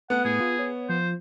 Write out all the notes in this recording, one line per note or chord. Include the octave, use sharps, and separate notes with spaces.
A3 B3 F#5
A2 G#4
F4
C#5
F3 C5